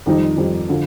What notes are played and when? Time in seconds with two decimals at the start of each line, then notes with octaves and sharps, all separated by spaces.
0.06 F2 D#3 G3 C4 D#4
0.37 F2 D#3 G3 C4 D#4
0.69 D3 F3